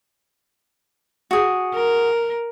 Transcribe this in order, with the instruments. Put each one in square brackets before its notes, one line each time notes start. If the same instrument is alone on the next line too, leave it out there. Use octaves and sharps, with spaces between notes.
[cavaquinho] F#4 G#4
[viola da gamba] A#4